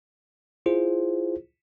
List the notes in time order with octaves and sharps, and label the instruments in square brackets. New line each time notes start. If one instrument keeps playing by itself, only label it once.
[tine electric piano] E4 F4 G#4 C5